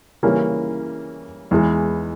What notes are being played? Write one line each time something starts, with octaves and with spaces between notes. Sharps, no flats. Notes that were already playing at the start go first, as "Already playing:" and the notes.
C#3 E3 G3 A#3 C#4
E2 E3 G#3